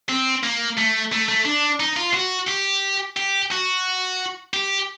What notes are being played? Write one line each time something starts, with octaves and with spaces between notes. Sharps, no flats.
C4
A#3
A3
A3
A3
D4
D#4
F4
F#4
G4
G4
F#4
G4